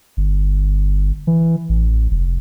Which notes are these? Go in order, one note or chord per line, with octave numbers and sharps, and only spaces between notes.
G1
E3
A1
F1